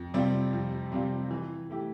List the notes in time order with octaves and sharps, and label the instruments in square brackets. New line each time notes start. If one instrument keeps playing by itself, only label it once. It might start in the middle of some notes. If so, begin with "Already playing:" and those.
Already playing: [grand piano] F2
C3 G3 C4 F4
F2
C3 G3 C4 F4
E3
A3 E4 G4